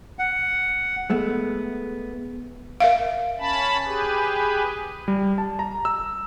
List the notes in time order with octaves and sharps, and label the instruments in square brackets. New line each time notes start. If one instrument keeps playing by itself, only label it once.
[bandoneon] F#5
[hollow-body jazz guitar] G#3 A3 B3
[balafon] A#4 E5 F5
[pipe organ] C#4 A5 B5
G4 G#4 B4
[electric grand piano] G3
A5
A#5
E6